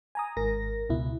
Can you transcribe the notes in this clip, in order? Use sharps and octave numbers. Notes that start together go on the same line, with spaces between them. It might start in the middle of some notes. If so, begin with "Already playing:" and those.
G#5 A#5 D#6
G#1 G#2 A#4 A#6
C#2 B2 E4